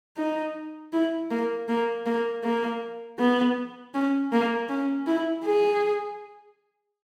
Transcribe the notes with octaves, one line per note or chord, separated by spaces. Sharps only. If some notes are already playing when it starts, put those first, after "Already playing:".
D#4
E4
A#3
A#3
A#3
A#3
B3
C#4
A#3
C#4
E4
G#4